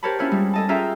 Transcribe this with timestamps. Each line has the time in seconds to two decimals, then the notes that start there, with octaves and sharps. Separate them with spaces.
0.03 G4 A#4 C5 C#5 A5 B5
0.19 C#4 D4 E4 F4 C#5
0.31 G3 G#3 E4
0.54 A4 D#5 A5
0.69 C#4 F4 G#4 E5 G5 A#5